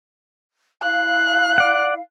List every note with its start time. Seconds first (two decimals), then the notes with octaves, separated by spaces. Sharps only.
0.82 E4 F5 F#6
1.58 D5 F#5